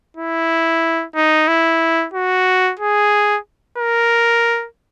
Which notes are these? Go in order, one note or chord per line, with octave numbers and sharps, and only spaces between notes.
E4
D#4
E4
F#4
G#4
A#4